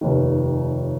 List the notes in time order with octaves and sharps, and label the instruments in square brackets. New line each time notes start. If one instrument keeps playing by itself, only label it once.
[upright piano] F1 D#2 D#3